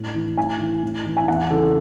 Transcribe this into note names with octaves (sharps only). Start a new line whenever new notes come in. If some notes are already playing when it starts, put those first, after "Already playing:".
Already playing: A2
E3
A2 G#5
E3
A2
E3
G#5
E2 F#5
C#3 E3 A4